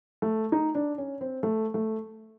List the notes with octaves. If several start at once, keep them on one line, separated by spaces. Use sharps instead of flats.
A3
D#4
D4
C#4
C4
A3
A3